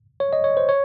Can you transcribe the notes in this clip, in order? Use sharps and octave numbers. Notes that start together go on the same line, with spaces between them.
C#5
D#5
C#5
C5
C#5